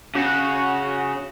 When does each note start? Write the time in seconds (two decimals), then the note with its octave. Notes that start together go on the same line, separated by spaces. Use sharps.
0.15 C#3 F#4